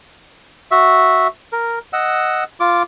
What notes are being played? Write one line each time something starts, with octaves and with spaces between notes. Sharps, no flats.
F#4 E5
A#4
D#5 F#5 E6
F4 D6